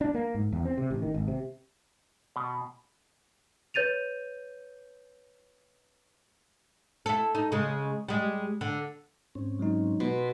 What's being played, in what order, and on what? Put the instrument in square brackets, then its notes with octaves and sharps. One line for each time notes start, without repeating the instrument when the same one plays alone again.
[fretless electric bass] D4
A#3
G#2
E2
C4
C3
A1
D#3
G#1
C3
[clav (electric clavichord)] B2
[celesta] B4 C#5 G6 A6 D#7 F7
[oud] E4 A4
D#4
C#3 G#3
G3 G#3
D3
[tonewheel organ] G#2 C4 C#4
[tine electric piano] F#3 G#3 D#4
[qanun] B2 [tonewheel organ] B4 B5 C6